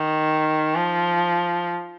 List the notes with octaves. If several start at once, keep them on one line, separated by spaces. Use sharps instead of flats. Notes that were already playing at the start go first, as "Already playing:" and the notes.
Already playing: D#3
F3